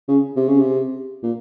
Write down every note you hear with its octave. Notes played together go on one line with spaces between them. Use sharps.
C#3
C3
C#3
C3
A#2